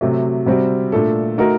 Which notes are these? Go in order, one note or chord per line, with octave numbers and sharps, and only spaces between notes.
C3 F#3 A3
C3 G3 C4 F#4
A#2 A3 D4 A4
A3 D#4 F#4 A#4